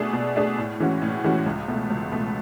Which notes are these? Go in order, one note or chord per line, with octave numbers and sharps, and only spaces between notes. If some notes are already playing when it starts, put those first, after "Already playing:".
Already playing: B2 A3 D4 G#4
B2
A3 D4 G#4
A2
E3 G#3 C#4 F#4
A2
E3 G#3 C#4 F#4
C#2
B2 A3
C#2
B2 A3